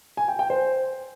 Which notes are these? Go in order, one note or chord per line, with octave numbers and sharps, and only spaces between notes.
G#5
G5
G5
C5